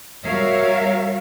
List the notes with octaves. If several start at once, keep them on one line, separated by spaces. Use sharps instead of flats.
G3 F#4 A#4 C#5 E5 F5